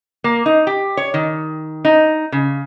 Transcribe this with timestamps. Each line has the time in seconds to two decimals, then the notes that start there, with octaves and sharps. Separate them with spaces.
0.24 A#3
0.46 D#4
0.67 G4
0.97 C#5
1.14 D#3
1.85 D#4
2.32 C#3